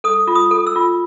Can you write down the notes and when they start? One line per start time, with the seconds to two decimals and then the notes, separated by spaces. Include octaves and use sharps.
0.04 A4 D#6
0.27 F4
0.35 D#6
0.51 A4
0.67 E6
0.76 F4